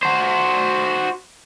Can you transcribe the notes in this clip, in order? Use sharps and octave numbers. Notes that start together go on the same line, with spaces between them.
F#4 C5